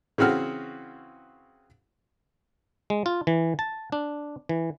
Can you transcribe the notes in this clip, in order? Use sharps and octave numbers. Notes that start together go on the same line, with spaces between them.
C#3 E3 C4 F#4 F6
G#3
F4
E3
A5
D4
E3